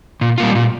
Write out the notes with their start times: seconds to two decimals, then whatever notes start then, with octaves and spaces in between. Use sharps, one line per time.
0.21 A#2
0.38 G3 A#3 F4
0.55 A#2